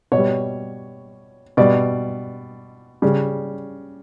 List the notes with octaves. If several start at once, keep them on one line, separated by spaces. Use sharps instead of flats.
B2 C#5
G3
B2 G3 D5
C#3 G3